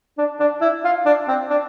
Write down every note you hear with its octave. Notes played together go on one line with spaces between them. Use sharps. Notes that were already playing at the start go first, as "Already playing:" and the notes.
D4
D4
E4
F4
D4
C4
D4